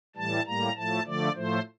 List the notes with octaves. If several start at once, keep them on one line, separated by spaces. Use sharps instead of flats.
A2 E3 G3 A5
A2 G3 A#3 A#5
A2 F3 A3 A5
D3 F3 A3 D5
A2 F3 A3 C5